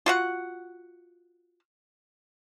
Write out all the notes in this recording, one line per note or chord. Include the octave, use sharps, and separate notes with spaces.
F4 F#4 F#5